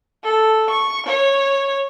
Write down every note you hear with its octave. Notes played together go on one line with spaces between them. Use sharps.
A4
C#6
C#5